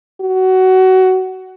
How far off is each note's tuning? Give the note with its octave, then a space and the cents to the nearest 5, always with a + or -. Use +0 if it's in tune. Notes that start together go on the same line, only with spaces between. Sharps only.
F#4 +20